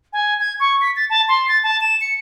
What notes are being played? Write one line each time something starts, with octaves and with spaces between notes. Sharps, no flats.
G#5
G#6
C#6
B6
A6
A5
C6
A6
A5
E7
C#7